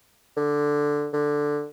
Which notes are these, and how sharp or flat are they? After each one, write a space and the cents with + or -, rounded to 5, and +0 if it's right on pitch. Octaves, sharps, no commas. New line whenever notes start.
D3 +0
D3 +5